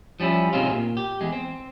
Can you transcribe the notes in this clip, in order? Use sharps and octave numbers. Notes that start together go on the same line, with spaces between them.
F3 G3 C#4 E4
G#2 C3 G#3 C4 C#4 F4
A#2
G4
E2 G#3
C4